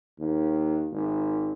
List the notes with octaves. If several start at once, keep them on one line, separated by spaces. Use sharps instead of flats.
D#2
G#1